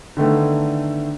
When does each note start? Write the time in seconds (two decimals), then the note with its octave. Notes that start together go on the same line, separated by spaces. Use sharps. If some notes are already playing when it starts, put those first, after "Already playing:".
0.17 D3 D#3 A3 B3